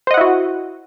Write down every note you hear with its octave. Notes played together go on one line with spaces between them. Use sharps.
E4 F#4 C5 D#5 F#5